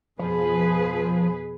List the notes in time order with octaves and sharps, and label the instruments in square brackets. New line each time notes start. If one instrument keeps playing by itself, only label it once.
[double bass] F2 B2 [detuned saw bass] F3 [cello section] G#4 B4